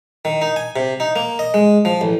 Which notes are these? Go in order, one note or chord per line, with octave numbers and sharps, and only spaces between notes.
D#3
D#4
G#5
C3
D#4
A#3
D#5
G#3
F3
A1